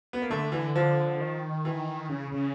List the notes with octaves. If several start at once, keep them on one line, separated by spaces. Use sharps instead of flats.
B3
A#3
D3 A3
E3
F3
D#3
E3
C#3
C#3